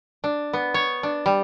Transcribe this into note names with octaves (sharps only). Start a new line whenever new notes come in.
D4
B3
C#5
D4
G3